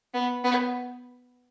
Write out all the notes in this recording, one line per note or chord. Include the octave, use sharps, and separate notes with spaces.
B3
B3